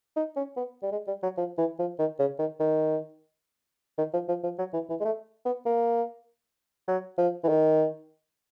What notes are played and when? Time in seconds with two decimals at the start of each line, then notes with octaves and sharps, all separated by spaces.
0.16 D#4
0.36 C#4
0.57 B3
0.83 G3
0.92 G#3
1.07 G3
1.23 F#3
1.37 F3
1.58 E3
1.79 F3
1.99 D#3
2.19 C#3
2.39 D#3
2.60 D#3
3.98 D#3
4.13 F3
4.28 F3
4.43 F3
4.58 F#3
4.73 E3
4.89 E3
5.00 G#3
5.05 A3
5.45 B3
5.65 A#3
6.88 F#3
7.18 F3
7.44 E3
7.49 D#3